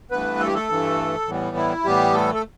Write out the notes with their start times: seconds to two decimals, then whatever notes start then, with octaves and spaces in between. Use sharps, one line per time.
0.11 G2 E3 A3 B3 B4
0.40 A4
0.47 G4
0.54 A3 A4
0.69 G2 E3 A3
1.27 A2 E3 G3 B3
1.57 E4
1.84 A2 E3 G3 B3 G4
2.13 A3 A4
2.34 A4